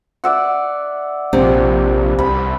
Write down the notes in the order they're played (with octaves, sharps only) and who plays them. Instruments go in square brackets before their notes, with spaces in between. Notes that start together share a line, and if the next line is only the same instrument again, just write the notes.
[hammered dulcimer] D5 E5 F#5
[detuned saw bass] A#1 [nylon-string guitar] C3
[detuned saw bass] C2 [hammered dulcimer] B5